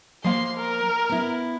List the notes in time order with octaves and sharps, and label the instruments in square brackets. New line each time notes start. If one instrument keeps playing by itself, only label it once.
[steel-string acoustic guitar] F3 A#3 F5 [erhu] C6
[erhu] A#4
[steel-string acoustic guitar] B3 E4